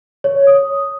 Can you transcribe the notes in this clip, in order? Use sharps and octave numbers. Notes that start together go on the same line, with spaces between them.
C#5
D#6